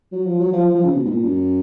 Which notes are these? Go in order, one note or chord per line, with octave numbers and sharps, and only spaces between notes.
F#3
F3
F#3
F3
F3
F3
C#3
B2
G#2
A#2
F#2